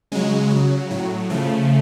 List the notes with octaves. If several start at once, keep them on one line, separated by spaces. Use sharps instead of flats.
C#3 F#3 G#3
C#3 F#3
A2 F#3
C#3 F3 A3